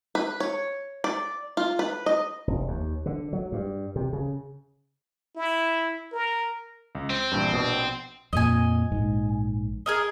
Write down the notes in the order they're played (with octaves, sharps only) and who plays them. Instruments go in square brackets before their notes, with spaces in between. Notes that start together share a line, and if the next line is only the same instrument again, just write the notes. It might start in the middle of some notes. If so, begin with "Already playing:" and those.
[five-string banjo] B4
C#5
D5
F4
B4
D#5
[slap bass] F1
D#2
D3
F#3
G2
C3
C#3
[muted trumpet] E4
A#4
[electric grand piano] C#2
[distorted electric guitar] C4 [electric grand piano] C5
[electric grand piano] A#1 E2 G2
A#1 B2 D#6
[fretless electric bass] F2 A#2 [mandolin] D#5 G#5
[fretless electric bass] A#1 G#2
[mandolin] G#4 A#4 D#5